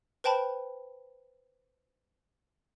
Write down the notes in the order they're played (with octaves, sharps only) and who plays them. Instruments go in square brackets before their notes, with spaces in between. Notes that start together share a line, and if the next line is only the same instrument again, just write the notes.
[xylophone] B4 C5 G5 A5 B5